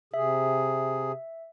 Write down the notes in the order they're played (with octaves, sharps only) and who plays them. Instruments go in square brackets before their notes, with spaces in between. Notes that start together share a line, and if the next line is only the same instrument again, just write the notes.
[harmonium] C3 G#4 [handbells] E5